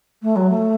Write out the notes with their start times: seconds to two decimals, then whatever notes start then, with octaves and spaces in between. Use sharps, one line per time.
0.22 A3
0.35 F#3
0.49 A3